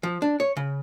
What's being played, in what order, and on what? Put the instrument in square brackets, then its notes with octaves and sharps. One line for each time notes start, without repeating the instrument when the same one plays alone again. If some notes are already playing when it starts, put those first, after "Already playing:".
[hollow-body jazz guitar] F3
D4
C#5
C#3